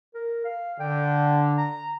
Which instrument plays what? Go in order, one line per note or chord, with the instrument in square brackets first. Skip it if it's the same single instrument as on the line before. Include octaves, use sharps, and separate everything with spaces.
[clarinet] A#4
F5
[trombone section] D3 [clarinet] G5
[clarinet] A#5